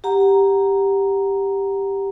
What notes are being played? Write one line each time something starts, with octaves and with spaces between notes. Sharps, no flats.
G4 F#5 A#5